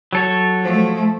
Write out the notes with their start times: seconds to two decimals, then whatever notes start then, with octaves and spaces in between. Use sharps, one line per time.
0.13 F#3 A4 C#5
0.62 F3 A3